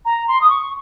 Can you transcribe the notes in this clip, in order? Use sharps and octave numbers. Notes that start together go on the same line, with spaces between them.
A#5
C6
D#6
C#6